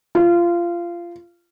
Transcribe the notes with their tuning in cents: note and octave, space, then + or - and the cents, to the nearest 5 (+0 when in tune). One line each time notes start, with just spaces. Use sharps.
F4 -20